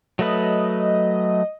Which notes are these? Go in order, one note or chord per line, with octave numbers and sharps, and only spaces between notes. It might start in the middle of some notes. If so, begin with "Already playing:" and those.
F#3 A3 B4 D#5